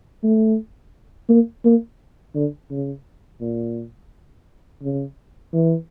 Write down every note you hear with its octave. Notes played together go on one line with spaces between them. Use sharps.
A3
A#3
A#3
D3
C#3
A#2
C#3
E3